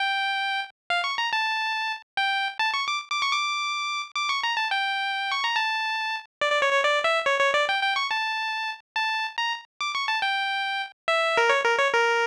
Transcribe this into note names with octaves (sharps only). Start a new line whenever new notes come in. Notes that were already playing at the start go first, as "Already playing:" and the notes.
Already playing: G5
F5
C#6
A#5
A5
G5
A5
C#6
D6
D6
C#6
D6
D6
C#6
A#5
A5
G5
C#6
A#5
A5
D5
D5
C#5
C#5
D5
E5
C#5
C#5
D5
G5
G5
C#6
A5
A5
A#5
D6
C#6
A5
G5
E5
A#4
C#5
A#4
C#5
A#4